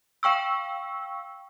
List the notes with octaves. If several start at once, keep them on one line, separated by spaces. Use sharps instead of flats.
F5 G5 C#6 E6